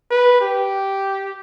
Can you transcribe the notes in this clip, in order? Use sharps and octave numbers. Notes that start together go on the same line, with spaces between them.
B4
G4